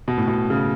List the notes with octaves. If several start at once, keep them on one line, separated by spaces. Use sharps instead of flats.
B2
A2
B2
C#3